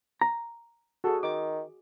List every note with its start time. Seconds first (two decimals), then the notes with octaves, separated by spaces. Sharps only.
0.21 A#5
1.04 F#4 G#4 A4
1.23 D#3 D6